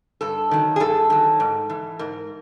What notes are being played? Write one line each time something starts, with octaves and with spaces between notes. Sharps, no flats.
G2 A4
D#3 F#3
G#4
G2 A4
D#3 F#3
G#2
E3
G#2 A#4